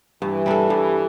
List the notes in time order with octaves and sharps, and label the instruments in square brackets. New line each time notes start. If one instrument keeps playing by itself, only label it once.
[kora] G2 [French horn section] E3
[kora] G3 D4 A4
G2